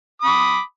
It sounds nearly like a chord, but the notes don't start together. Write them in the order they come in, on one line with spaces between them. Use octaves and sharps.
D#6 B5 D6